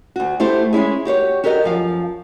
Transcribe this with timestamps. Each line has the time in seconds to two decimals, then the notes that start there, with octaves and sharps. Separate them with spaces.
0.16 D2 F#4
0.40 A3 E4 G4 C5
0.73 G#3 C#4 E4 G#4
1.05 F#4 G4 C5 C#5
1.44 F#4 G4 A4 A#4 C5 D#5
1.64 F#2 F3 F5